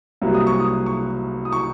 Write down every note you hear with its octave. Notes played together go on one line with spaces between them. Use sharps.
C2 C3 F#3 A#3
D#6
C#6
D#6
C#6
D#6
C#6